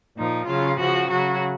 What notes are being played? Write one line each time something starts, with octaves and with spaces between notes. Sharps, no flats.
A#2 F3 D#4
C#3 F#3 F4
C#3 F3 F#4
C#3 F#3 F#4